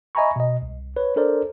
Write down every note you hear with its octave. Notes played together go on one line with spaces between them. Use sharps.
D#5 E5 G#5 A#5 B5 C#6
B2 D#5
C2
B4 C#5
D4 A4 A#4 C5 D5